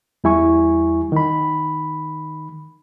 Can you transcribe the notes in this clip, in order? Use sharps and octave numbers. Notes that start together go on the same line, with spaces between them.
E2 G3 E4 G#5 C#6
D#3 B5